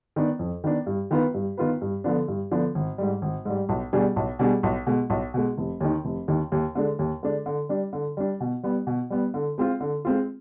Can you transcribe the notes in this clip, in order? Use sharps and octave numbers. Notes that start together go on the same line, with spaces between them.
D#3 B3 D4
F2
D#3 B3 D4
G2
D#3 B3 F4 B4
G2
D#3 B3 F4 B4
G2
D3 F3 B3 D4
G2
D3 F3 B3 D4
G#1
G#2 G3
G#1
G#2 G3
B1
B2 G3 D4 G#4
B1
B2 G3 D4 G#4
B1
B2 G#3
B1
B2 G#3
F1
D#2 D#3
F1
D#2 D#3
D#2
D3 G#3 D4
D#2
D3 G#3 D4
D3
G3 D4
D3
G3 D4
B2
G3 B3
B2
G3 B3
D3
G#3 C4 F4
D3
G#3 C4 F4